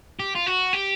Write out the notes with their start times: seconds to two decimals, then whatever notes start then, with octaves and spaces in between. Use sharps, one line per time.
0.20 G4
0.35 F4
0.46 F#4
0.73 G4